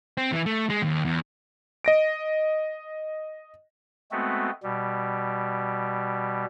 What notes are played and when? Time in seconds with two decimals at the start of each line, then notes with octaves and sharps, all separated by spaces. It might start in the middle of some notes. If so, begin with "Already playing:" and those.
0.17 C4
0.32 E3
0.46 A3
0.70 G#3
0.82 D#2
1.05 E2
1.85 D#5 A#6 D7
4.11 G#3 A3 B3 C4 F#4
4.63 B2 G3